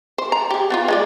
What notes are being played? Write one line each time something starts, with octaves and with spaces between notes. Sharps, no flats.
C5
A#5
G4 G#4
B3 D4 F4
G#3 F4 D5